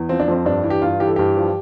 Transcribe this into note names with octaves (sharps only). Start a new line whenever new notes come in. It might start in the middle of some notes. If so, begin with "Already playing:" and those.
Already playing: E2
F3 C4
D4
F2 C4
G2 D4
E3
G4
G2 F4
E3 G4
A4
G2 G4
F3